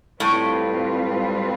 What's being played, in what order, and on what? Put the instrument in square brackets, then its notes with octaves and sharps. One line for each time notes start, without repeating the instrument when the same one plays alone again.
[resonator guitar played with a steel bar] A2 [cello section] G3 C4 F4 B4